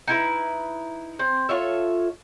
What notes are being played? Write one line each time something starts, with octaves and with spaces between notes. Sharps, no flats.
D#4 E4 B4
C4
F4 A4 C#5 E5